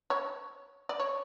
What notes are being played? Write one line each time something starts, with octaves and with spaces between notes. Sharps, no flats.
C#5
D5
C#5